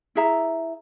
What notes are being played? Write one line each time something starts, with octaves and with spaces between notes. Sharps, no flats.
E4 G#4 E5 A#5